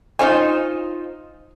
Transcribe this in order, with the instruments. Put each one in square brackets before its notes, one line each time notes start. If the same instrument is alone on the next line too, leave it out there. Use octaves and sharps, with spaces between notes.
[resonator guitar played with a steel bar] D#4 F4 C5 [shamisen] C#5 F5 G#5